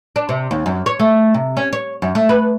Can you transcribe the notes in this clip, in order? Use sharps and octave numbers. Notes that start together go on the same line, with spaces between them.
D4
C3
D#2
F#2
C#5
A3
C3
C#4
C#5
F#2
A3
B4